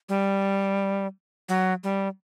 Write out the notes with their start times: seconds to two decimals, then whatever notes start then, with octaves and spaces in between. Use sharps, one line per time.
0.09 G3
1.49 F#3
1.83 G3